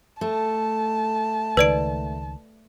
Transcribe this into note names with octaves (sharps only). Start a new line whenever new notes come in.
A3 A5
C#2 D#3 B4 D5 D7